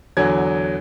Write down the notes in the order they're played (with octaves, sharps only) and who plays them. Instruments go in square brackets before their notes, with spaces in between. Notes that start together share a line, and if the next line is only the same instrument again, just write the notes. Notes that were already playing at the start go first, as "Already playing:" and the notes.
[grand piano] E2 D3 F#3 G#6